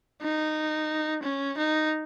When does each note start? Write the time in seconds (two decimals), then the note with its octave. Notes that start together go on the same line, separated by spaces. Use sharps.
0.21 D#4
1.23 C#4
1.57 D#4